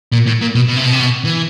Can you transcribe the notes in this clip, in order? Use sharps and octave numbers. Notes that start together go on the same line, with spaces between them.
A#2
A2
A#2
B2
B2
C3
B2
C3
B2
E3